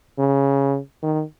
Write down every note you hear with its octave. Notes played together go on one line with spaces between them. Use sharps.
C#3
D#3